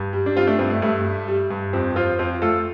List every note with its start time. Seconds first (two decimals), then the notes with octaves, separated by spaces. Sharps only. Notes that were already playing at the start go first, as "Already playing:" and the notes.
Already playing: G2
0.13 G3
0.26 D4
0.36 G3 C4 F4
0.47 A3 D4
0.59 G2 C4
0.70 A3
0.82 G2 A3
1.05 G3
1.28 G3
1.50 G2
1.73 F2 C4
1.96 F3 C4 F4
2.19 F2 C4 F4
2.42 A3 F4 A4